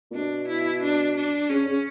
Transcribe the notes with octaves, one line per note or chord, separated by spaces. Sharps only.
A#2
B2 D4
E4
D4
D4
C#3 C#4
C#3